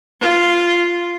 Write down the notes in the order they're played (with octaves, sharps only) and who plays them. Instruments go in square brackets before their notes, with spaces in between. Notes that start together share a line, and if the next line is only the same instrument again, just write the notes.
[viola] F4